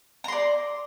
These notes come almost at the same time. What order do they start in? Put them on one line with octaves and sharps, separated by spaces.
A#5 C6 D5